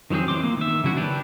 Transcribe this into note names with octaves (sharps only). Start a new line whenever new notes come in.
D#3 F3 F#3 C4 G#4
E3 C4 C6 D6
A#3
D#3 E5
C#3 F#3 E4 F#4
D4 E4 G4 B4